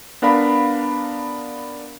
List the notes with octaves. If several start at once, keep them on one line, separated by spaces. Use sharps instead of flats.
B3 D4 A#4 F5 B5